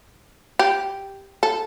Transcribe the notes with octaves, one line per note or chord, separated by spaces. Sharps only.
G4
A4